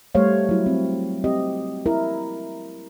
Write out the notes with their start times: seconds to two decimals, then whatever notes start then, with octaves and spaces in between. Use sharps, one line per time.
0.15 G3 A3 C5 C#5 F5
0.49 F#3 E4
0.66 C4
1.24 C4 G4 D#5
1.86 E4 A#4